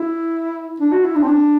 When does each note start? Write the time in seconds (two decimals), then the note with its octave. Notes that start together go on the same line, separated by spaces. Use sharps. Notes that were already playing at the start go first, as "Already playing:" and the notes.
Already playing: E4
0.80 D4
0.92 F#4
1.04 E4
1.16 D4
1.23 C4
1.28 D4